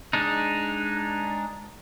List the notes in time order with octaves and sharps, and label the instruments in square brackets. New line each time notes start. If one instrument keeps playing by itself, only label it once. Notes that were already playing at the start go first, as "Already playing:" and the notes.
[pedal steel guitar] G#3 D4 D#4